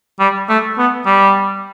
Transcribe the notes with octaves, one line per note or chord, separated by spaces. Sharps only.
G3
A3
B3
G3